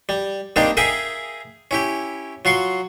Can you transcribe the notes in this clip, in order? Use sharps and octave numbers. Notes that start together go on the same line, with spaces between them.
G3
G3 A#3 C4 D4 D#4 G4
G#4 A#4 E5 F5 G5 G#5
C#4 E4 G4
F#3 F4 C6 C#6